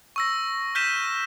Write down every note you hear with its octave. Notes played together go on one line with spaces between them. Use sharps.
C#6 E6 A#6
F6 G6 B6 D#7 E7